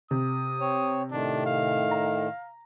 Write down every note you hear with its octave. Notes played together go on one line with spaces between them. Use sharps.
C3 D#6
C4 C#5
A2 D#3 D4
F5
A#5